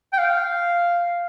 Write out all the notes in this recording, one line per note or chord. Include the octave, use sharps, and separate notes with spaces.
G5
F5